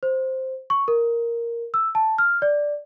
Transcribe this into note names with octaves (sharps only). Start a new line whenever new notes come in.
C5
C#6
A#4
E6
A5
F6
D5